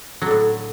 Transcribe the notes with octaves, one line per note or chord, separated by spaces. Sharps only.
A2 D3 F#3